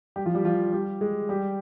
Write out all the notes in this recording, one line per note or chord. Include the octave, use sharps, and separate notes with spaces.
G3 G4
F3 F4
G3 G4
F3 F4
G3 G4
G#3 G#4
G3 G4